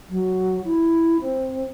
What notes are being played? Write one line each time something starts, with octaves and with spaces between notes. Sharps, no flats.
F#3
E4
C4